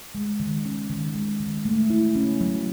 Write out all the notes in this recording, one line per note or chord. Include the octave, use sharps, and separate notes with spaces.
G#3
D#3
C#4
D#3
G#3
D#3
A3
E4
C#4
F#3